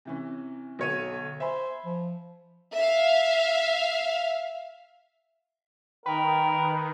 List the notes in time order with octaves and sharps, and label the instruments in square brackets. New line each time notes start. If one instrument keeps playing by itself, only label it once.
[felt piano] C3 E3 C#4
[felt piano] B1 C#5 D#7 [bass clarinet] D3
[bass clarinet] C5 [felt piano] E5 G#5 B5
[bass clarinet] F3
[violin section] E5 F5
[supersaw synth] D#3 [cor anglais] A#4 [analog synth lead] B4 [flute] G5